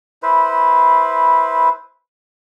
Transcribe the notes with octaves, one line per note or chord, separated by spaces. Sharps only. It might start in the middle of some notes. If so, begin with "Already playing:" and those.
E4 B4 C5